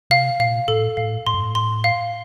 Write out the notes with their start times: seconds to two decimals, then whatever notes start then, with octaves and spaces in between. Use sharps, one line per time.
0.10 C3 F5
0.40 A#2 F5
0.68 A2 A4
0.97 A2 F5
1.27 A2 C6
1.34 G2
1.41 A2
1.55 C6
1.84 F5